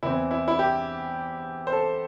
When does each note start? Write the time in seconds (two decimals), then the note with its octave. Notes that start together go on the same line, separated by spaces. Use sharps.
0.03 E2 E3 C4 E4
0.31 E4
0.48 E4
0.59 G4
1.67 C5
1.72 A4